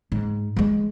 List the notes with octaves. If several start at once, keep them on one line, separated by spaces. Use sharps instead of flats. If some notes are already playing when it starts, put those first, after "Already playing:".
G#2
F3 G#3